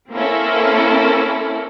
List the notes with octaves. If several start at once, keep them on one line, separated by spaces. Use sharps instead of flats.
A#3 C4 C#4 E4 A4